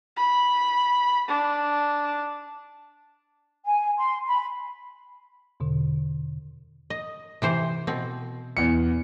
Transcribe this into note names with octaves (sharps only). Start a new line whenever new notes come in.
B5
D4
G#5
C6
B5
E2 B2 D3
D#5
C3 E3 C5
B2 C4
E2 C#7